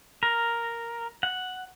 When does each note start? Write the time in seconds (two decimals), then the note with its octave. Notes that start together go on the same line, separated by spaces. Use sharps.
0.23 A#4
1.23 F#5